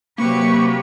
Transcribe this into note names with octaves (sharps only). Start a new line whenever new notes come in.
C3 F#3 A#3 G4 B4 C#6